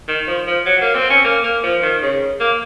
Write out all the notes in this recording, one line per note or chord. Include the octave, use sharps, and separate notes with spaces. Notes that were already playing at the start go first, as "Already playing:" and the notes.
D#3
F3
F3
F#3
A#3
C4
C#4
A#3
A#3
F3
D#3
C#3
A#3